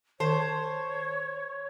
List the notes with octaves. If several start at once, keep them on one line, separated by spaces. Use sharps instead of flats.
D#3 C5 C#5 A5